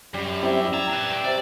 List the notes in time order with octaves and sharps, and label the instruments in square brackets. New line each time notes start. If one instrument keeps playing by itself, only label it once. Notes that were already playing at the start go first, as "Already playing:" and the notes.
[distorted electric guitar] F#2 [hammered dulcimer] G3
[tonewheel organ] C4 E4 G4 [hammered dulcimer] D5 E5 G5
[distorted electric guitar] A#5 [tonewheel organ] E6 G#6 A6
[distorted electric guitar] D4 B4
[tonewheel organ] G5 E6
[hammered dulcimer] C3 [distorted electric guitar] D5